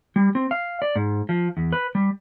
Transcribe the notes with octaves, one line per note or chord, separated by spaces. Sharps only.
G3
C4
F5
D5
G#2
F3
E2
B4
G3